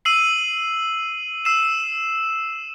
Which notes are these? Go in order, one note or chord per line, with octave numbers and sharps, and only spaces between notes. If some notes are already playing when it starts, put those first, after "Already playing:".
E6 C7 D#7 F#7
E6 C7 E7